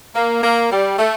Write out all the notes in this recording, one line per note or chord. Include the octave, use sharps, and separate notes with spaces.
A#3
A#3
G3
A3